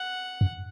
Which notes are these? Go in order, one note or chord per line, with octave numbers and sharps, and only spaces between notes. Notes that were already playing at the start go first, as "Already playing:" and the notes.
Already playing: F#5
F#2